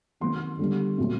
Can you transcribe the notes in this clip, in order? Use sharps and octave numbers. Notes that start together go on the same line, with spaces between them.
C3 D#3 F#3 A#3 C6
D3 G3 B3
A#2 F#3 A3 C4